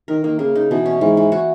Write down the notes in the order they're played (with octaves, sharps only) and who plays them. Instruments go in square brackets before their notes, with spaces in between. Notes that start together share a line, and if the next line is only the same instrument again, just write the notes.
[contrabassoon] D#3 [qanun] A#4
[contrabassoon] D#3 [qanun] A#3
[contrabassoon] C#3 [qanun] A#3
[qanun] D#4
[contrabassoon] B2 [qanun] E3
[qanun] C#4
[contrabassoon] G#2 [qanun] E3
[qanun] E3
F#4